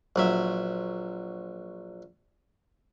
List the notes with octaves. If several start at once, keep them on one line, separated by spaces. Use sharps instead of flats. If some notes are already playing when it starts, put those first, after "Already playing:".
A#1 F#3 E5